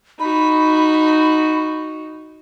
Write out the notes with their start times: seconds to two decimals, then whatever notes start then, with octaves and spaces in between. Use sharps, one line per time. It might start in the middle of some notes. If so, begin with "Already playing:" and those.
0.20 D#4 F#4 B5